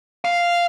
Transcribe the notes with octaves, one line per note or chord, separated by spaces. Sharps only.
F5